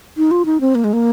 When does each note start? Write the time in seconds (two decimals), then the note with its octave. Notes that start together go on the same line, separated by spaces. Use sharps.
0.17 D#4
0.31 F4
0.45 D#4
0.61 C4
0.75 A#3
0.84 G#3
0.93 A#3